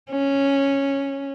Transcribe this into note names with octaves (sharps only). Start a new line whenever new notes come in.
C#4